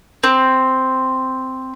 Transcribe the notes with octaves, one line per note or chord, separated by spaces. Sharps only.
C4